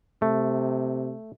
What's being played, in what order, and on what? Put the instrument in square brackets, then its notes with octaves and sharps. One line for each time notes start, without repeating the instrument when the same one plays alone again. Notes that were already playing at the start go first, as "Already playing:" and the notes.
[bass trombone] C3 [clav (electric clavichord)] A3